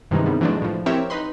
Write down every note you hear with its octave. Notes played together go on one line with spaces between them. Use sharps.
G2 C3 D#3 E3 G#3 D#4
C3 G3 B3
E3 F#3 G#3 A3 D4
A2 F3
C4 E4 G4 A#4 C#5 E5
D#4 B4 B5 C6